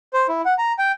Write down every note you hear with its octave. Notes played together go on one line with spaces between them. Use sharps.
C5
E4
F#5
A#5
G5